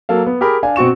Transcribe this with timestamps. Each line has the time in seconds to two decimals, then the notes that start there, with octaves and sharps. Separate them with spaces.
0.09 F#3 A#3 A4 F5
0.26 B3
0.41 G4 G#4 A#4 B5
0.63 D4 F5 G#5
0.76 B2 C4 F#4 C#6 E7